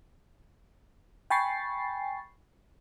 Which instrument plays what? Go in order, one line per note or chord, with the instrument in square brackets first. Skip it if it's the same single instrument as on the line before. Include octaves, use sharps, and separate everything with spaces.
[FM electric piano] G5 G#5 B5 C#6 A6 C7